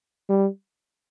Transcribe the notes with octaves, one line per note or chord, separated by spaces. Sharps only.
G3